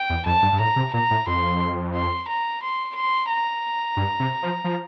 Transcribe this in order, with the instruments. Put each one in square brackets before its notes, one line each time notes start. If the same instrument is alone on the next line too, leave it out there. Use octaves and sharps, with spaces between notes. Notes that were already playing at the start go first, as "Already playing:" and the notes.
Already playing: [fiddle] G5
[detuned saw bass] E2
[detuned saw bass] F2 [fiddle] A5
[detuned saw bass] G2
G2
[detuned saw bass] A2 [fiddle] A#5
[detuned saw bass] C3
[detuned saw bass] A#2 [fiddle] A#5
[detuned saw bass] A2
[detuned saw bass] F2 [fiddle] C6
[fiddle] C6
A#5
C6
C6
A#5
[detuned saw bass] G2
C3
F3
F3